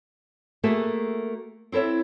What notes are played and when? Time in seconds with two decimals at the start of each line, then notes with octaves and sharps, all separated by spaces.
0.63 A3 A#3 F#4 G#4 A4 E5
1.72 C4 E4 A4 C#5 E5